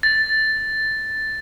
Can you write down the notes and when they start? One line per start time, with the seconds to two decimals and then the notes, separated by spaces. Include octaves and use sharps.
0.03 A6